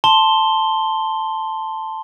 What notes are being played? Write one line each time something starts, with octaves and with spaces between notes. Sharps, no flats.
A5 C6 G7